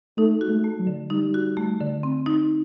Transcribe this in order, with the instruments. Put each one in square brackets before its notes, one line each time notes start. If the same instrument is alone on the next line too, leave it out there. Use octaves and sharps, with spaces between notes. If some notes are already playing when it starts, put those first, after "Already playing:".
[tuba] A3 [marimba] D#4
[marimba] F#4
[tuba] A3
[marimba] A3
[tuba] F#3
[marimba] D3
[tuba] G3 [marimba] D#4
[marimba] F#4
A3
D3
C4
D#4